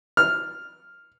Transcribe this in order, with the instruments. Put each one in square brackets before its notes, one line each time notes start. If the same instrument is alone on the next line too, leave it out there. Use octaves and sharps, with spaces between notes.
[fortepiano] F6